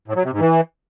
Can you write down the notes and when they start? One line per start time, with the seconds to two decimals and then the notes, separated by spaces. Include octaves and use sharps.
0.08 A2
0.16 F#3
0.24 C3
0.32 G#2
0.41 E3